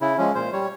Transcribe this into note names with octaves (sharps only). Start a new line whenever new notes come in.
C#3 E4
F3 G#3 C#4
A#2 C5
G3 C#5